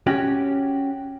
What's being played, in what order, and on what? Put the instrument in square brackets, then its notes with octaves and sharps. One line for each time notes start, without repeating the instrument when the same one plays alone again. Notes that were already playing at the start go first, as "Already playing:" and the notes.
[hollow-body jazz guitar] C#4 F#4 G4